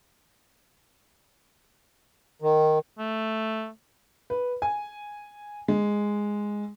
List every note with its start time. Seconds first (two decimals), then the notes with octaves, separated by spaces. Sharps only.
2.42 D#3
2.98 A3
4.30 B4
4.62 G#5
5.68 G#3